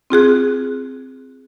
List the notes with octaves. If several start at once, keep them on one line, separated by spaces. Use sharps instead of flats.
C4 F4 G#4 F#6